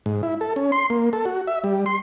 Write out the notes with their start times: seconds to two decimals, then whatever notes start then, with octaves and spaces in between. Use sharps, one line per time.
0.06 G#2
0.23 E4
0.41 A4
0.56 C#4
0.72 C6
0.90 A#3
1.13 A4
1.25 F#4
1.47 E5
1.64 G3
1.86 C6